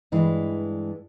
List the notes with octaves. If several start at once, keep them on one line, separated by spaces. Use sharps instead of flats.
G2 E3 G#3 D4